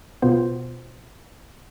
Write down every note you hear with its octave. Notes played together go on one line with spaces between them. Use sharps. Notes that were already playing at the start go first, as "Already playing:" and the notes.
B2 B3 F4 C5